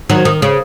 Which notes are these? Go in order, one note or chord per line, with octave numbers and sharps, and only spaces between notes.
D#3 F#3
D#3
C#3